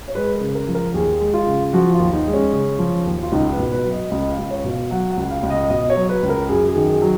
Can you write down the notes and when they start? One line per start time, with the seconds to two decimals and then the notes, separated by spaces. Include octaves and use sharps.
0.08 C#5
0.15 G#3 B4
0.34 A#4
0.41 C#3
0.55 A#4
0.68 F3
0.75 A#4
0.94 D#2 G#4
1.21 G#3
1.34 F4
1.47 C#3
1.73 F3 F#4
1.93 F4
2.00 D#2
2.13 D#4
2.27 G#3
2.33 C#4
2.53 C#3
2.79 F3
3.05 D#2
3.23 F4
3.32 C#2 D#4
3.52 B4
3.59 B2
3.72 B4
3.85 F#3
3.92 D#5
4.11 C#2 D#5
4.31 F5
4.38 C#2
4.51 C#5
4.64 B2
4.71 F5
4.91 F#3 F#5
5.11 F#5
5.17 C#2
5.31 F5
5.43 C#2
5.50 D#5
5.70 B2 D#5
5.90 C#5
5.96 F#3
6.09 B4
6.23 C#2
6.30 A#4
6.49 F#2 G#4
6.69 G#4
6.76 D#3
6.89 G#4
7.02 F#3